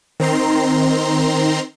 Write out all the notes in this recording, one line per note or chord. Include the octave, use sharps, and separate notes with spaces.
D#3 C4 A#5 C6